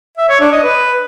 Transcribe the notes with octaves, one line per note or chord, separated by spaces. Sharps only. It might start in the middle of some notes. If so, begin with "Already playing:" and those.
E5
C#5
D4
D#5
B4